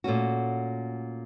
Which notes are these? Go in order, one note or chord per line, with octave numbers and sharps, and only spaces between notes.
A#2 A3 C#4 F#4